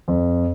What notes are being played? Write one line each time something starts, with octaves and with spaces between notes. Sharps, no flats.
F2